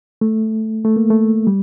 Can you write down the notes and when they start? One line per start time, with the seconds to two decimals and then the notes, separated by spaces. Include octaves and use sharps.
0.21 A3
0.85 A3
0.96 A#3
1.10 A3
1.47 G3